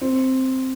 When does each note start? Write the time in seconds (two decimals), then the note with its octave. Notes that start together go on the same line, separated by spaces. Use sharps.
0.01 C4